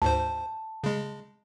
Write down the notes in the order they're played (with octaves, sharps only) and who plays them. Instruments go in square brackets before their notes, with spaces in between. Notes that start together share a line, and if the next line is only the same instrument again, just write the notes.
[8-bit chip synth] D2 G#2 C5 [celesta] A5
[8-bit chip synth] C#3 G#3